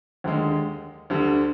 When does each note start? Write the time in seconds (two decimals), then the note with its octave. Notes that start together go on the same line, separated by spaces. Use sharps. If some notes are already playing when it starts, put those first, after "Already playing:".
0.24 D#2 D3 G#3
1.10 D2 D3 G3